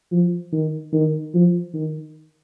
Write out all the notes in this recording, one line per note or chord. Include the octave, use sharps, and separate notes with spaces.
F3
D#3
D#3
F3
D#3